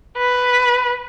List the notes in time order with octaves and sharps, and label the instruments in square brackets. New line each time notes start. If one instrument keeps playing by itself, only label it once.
[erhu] B4